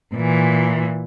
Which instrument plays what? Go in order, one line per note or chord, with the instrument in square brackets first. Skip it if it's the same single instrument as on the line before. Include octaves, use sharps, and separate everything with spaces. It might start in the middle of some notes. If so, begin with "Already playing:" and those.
[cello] A#2 E3